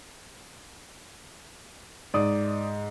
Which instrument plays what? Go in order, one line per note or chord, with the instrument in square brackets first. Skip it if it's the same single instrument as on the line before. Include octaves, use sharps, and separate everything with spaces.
[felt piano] G#2 [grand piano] D5 D#6